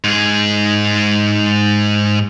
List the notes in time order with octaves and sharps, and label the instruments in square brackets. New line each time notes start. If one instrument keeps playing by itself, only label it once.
[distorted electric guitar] G#2 G#4